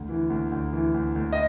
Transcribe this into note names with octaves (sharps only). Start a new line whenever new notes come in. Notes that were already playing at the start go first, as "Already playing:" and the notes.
Already playing: D2
E3
D2
D2
E3
D2
D2
D#5